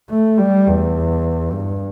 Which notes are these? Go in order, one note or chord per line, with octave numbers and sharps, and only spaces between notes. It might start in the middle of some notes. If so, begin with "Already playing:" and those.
A3
G3
E2
G2